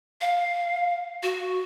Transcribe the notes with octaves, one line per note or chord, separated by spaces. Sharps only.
F5
F#4